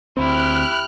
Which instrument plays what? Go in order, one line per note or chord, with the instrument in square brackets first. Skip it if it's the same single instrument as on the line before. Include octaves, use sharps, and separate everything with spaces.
[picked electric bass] D2 C4 [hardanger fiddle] E4 G4 [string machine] F6 F#6